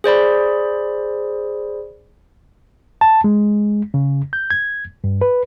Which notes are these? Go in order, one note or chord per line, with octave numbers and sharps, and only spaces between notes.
G#4 C5 D5 B5
A5
G#3
C#3
G6
G#6
G2
B4